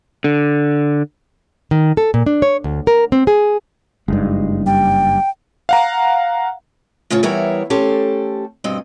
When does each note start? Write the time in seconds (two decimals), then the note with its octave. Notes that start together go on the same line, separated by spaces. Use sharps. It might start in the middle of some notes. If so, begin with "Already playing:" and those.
0.24 D3
1.71 D#3
1.97 A4
2.14 A#2
2.26 D4
2.42 C#5
2.64 D2
2.87 A#4
3.12 C4
3.27 G#4
4.08 F#1 G2 G#3 D#4
4.66 G3 G5
5.69 F5 F#5 A#5
7.10 A2 C#3 F3 F4 C#5
7.23 E3 G3 B3 E4 A#4 C#5
7.70 A3 C#4 G4 A4 C5
8.64 G2 B2 C4 D#5